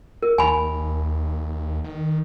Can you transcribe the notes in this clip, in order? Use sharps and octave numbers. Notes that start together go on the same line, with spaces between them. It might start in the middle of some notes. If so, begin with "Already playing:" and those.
A#4
D#2 G#5 B5
D#3